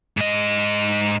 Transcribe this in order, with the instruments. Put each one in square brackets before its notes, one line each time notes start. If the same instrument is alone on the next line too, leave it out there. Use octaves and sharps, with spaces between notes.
[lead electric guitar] G#2 D#5